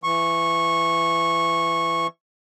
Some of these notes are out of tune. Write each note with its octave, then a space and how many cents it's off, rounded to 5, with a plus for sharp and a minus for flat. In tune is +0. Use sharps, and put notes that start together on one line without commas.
E3 +25 C#6 -15